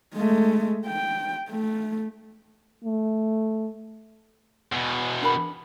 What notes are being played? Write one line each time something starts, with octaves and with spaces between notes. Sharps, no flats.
G#3 A3
G5
A3
A3
E2 B2
D4 A#4 B5